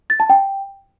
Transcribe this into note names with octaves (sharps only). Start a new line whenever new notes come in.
A6
A5
G5